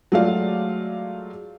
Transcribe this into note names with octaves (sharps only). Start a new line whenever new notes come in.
F#3 G#3 A3 F4 D5 F5